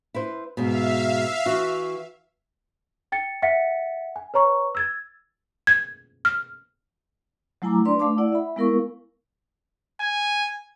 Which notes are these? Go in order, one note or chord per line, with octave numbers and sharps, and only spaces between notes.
E4 B4 C5
G#2 B2 E5 F5
E3 F#4
G5 A6 C#7
E5 F#5 A6 B6 C#7
G#5
B4 C#5 A#5 C#6
E6 G#6 A6
G#6
F6
F#3 A3 E4 G#5 A#5 D6
D4 B4 D5 C6
A3 F5 A5 D6
E4 D5 F#5
E5 B5
G#3 B3 E4 A#4 F5 C#6
G#5